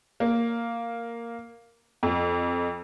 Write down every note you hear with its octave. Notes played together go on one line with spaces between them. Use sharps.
A#3
F2